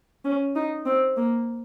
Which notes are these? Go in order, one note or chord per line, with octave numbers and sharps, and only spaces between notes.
C#4
D#4
C4
A#3